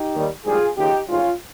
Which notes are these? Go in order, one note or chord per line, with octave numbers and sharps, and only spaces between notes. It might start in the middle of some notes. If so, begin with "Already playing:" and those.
Already playing: D#4 G4
D#2 D#3 G3
A#1 G#2 G3 F4 G#4
D#2 C#3 F3 D#4 G4
G#1 G#2 G3 C#4 F4